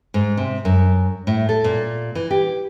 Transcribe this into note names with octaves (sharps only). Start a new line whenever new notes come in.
G#2
C3
F#2
A2
A4
A#2
E3
G4